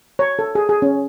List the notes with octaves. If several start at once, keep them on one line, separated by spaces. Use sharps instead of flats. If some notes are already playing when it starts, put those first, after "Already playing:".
C#5
A4
G#4
G#4
C#4